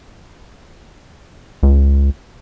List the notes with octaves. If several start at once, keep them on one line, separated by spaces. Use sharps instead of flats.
C#2